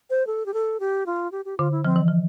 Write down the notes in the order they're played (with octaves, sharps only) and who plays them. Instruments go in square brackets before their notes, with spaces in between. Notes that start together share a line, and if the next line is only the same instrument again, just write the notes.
[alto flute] C5
A4
G4
A4
G4
F4
G4
G4
[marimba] D3 [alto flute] F4
[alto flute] E4
[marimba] F3 [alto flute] C4
[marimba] E3
F3